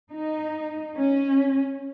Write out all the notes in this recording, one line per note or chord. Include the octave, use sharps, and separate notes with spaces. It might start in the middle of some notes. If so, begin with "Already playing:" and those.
D#4
C#4